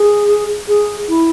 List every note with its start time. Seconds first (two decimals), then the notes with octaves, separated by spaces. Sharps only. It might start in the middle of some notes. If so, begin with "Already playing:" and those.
Already playing: G#4
0.68 G#4
1.08 E4